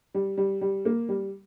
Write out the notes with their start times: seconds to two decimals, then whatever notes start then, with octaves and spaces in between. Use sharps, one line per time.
0.15 G3
0.38 G3
0.61 G3
0.85 A#3
1.09 G3